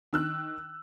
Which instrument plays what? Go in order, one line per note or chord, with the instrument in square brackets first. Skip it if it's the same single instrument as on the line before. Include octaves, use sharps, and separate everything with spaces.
[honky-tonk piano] D#3 E6 F#6